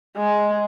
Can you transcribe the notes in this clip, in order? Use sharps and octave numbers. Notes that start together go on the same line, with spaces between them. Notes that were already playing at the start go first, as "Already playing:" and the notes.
G#3